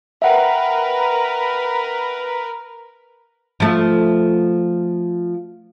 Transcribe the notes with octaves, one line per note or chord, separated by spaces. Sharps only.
A#4 B4 E5 F#5 G5
F3 A3